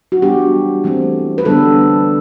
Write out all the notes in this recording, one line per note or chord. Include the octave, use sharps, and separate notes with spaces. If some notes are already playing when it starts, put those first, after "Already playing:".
F#4
E3 G3 B3 D4 G4
E3 A3 C4
B4
D3 G3 B3 D4 A4